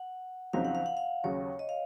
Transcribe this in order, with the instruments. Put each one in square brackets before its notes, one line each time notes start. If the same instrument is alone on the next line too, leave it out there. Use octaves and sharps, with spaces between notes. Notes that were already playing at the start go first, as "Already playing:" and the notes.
Already playing: [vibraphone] F#5
[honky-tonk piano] F2 C#3 F#3 C4 D#4 [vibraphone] F5
[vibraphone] F#5
F5
F#5
F5
[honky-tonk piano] D#2 C#3 F#3 [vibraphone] C#5
[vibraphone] D#5
F5